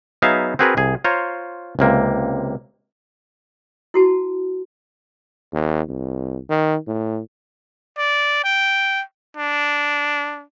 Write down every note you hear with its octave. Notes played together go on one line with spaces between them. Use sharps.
F#3 B3 D#4 G#4 E5 F5
C4 F#4 G#4 A#4 B4
C2 G#4
F4 C5 C#5 A#5
C#2 C3 A#3
E4 F#4 A5
D#2
C2
D#3
A2
D5
G5
D4